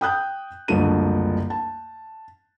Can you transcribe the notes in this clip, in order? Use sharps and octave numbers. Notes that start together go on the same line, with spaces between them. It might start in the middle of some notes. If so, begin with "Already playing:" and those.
G5 D#6 F#6 G6
F#1 C2 D3 F3 A3 D#7
A5